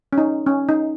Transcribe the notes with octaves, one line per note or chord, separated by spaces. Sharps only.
C#4
D#4
C#4
D#4